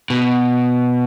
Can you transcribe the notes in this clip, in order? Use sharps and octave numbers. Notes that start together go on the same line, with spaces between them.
B2